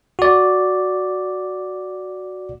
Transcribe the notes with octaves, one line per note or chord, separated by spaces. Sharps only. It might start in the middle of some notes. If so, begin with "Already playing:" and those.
F#4 D5